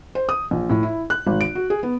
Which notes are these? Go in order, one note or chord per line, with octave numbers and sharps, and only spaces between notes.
C5
D#6
A#1
A2
E4
F#6
G#1
D7
F#4
G#4
B3